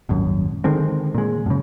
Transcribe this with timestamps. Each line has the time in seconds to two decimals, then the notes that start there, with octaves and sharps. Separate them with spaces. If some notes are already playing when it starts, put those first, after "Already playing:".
0.09 D#1 G#1 F#2
0.64 D3 D#3 G#3 C4
1.15 A#2 G#3
1.46 F#2 C#3